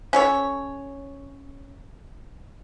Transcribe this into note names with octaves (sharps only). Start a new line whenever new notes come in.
C#4 A4 C#5